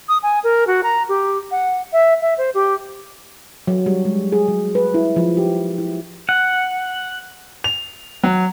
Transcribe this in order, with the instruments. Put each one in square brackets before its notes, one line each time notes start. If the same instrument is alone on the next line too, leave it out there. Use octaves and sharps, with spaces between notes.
[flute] D#6
G#5
A#4
F#4
A#5
G4
F#5
E5
E5
C5
G4
[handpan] F#3
G3
G#3
G#4
F#3
B4
E4
F3
G4
E4
[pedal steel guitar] F#5
[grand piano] F7
F#3